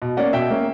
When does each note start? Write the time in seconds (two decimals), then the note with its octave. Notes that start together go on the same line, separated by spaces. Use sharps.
0.02 B2
0.17 A#3 C#4 D5 F#5
0.33 B2 E5 G5
0.50 A#3 C#4